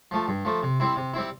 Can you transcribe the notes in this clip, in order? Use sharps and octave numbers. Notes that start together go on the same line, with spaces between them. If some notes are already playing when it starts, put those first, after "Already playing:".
F3 A3
G2
F3 A3
C3
G3 C4 E4
C3
G3 C4 E4